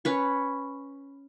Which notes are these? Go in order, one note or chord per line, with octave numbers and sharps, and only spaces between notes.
C#4 B4 C#6